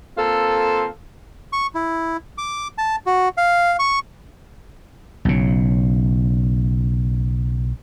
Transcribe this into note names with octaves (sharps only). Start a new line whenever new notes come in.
A#3 C4 F4 A4
C#6
E4
D6
A5
F#4
F5
C#6
B1 C#3